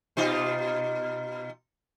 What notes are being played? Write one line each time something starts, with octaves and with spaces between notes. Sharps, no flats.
B2 D#4 F4